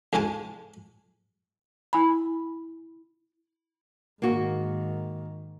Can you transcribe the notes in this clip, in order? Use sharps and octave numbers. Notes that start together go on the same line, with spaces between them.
A1 D2 G#2 G#5 A5
E4 G#5 B5
G#2 D#3 A#3 F#4